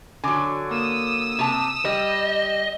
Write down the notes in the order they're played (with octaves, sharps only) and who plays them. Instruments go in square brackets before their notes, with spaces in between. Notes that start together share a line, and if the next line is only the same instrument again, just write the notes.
[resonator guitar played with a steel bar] D3 F#3 [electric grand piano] G#5 D6
[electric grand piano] A#3 [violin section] D#6 E6
[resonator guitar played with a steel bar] C3 G4 A5
[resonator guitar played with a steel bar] G3 [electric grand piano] G4 [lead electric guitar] D#5